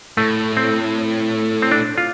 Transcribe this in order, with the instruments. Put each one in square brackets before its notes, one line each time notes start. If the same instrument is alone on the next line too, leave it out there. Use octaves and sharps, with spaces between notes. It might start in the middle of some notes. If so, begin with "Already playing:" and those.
[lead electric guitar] A2 [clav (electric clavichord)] A3
[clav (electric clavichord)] C4
C4
D4
F4